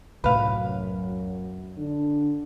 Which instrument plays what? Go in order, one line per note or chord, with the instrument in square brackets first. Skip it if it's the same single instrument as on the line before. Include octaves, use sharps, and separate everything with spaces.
[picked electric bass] C2 A2 [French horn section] F#2 F#3 [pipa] B4 F5
[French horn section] D3 D4